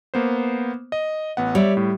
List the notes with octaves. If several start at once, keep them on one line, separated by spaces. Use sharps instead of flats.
A#3 B3 C5
D#5
A1 B3 F#5
G3 C#5 D5 E5
A2